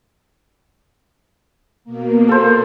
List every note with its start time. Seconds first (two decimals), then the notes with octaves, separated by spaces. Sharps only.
1.84 B2 A#3
2.29 A4 C5